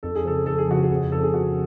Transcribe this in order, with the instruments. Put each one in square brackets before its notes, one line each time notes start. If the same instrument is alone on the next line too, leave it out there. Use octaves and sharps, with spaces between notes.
[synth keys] F2 [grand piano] A4
[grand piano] G#4
[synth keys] C#3 F3 [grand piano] A4
[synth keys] F2 [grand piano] A4
[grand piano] G#4
[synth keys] C#3 F3 [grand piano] F#4
[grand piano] G#4
[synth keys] F2
[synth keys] C#3 F3 [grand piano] A4
[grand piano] G#4
[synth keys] F2 [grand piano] F#4